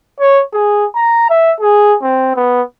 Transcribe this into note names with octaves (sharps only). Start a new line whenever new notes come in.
C#5
G#4
A#5
E5
G#4
C4
B3